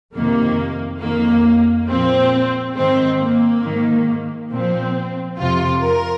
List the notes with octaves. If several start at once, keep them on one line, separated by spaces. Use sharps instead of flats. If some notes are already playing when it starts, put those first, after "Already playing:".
F2 C3 D#3 A#3
F2 D#3 A#3
A#2 F3 C4
G#2 D#3 C4
A#3
G#2 D#3
A#2 F3 C4
F2 C3 F3 F4
A#4